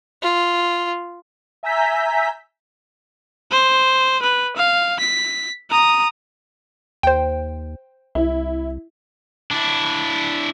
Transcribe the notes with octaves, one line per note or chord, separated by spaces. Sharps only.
F4
E5 G#5 A#5 E6 G6 B6
C5
B4
F5
B6
A#5 D#6
D#2 C5 G5
C2 E4
D4 E4